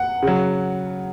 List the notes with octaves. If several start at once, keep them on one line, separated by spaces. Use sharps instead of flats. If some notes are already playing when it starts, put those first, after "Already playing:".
Already playing: F#5
C#3 F#3